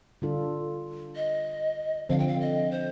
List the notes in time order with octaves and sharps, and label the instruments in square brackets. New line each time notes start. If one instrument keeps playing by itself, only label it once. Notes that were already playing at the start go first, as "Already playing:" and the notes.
[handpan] D3 G3 D4 F4 A4
[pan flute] D#5
[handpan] D3 F3 C4 [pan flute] F5
[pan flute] G5
F5
D#5
C5